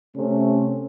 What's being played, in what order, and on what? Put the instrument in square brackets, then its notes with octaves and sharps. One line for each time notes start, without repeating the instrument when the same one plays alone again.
[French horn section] C3 A3 C#4